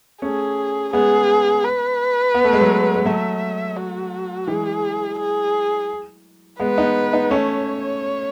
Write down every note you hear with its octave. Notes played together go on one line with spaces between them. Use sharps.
A3 C#4 G#4
G#3 B3 G#4
B4
B3
A3
G#3
F#3 A3
G#3
F#3 A3 E5
F#4
E3 G#3 G#4
G#4
G#3 B3 B4
B3 D#4
B3 D#4
A3 C#4 C#5